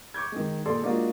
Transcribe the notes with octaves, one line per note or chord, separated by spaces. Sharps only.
C#6 D6 G6 G#6
D#3 G#3
A#2 G#4 A4 D5 C6
G#3 A#3 D4 D#4 F4 F#4